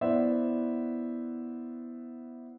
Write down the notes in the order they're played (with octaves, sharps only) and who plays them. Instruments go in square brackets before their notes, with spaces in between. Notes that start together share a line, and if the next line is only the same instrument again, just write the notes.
[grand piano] B3 E4 C5 D5 E5 F#5